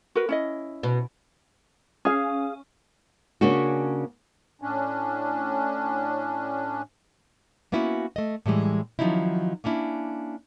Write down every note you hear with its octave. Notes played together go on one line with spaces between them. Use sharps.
F#4 A#4 B4
C#4 E4 D#5
B2
C#4 G#4 F5
C#3 A#3 C#4 D4 F#4
A2 C#4 D4
A#3 B3 C#4 E4 F#4 B4
A3 D#5
A2 E3 G3 G#3
D#3 F3 F#3 C#4 D#4 E4
A#3 C#4 D4 E4